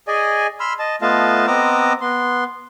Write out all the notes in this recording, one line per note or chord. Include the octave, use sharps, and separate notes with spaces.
G#4 D5 D#5 G#5
B5 C6 E6 F6
D#5 A5
A3 B3 F4 D#5 F5 A5
B3 C4 D#5 A#5 D6 E6
B3 C6